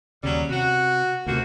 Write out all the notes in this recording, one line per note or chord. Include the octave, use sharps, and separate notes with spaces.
D#2 C#3 F#3 G3 C#4
C3 F#4
D2 C3 F3 A#3 F#4